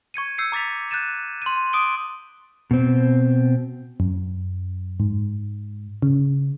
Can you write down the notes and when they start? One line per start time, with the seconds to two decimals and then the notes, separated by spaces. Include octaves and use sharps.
0.14 C#6 G#6 C#7 D#7
0.38 E6 G6 C7 C#7
0.52 A#5 D6 A6 B6 F7
0.91 F#6 G6 A6 D#7 E7
1.42 C6 D#7
1.73 D6 D#6 D7 G7
2.71 B2 C4
4.00 F#2
5.00 G#2
6.02 C#3